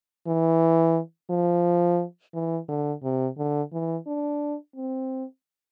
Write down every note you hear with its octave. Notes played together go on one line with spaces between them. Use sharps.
E3
F3
E3
D3
C3
D3
E3
D4
C4